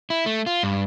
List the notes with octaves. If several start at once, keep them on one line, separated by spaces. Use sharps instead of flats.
E4
A3
F4
G2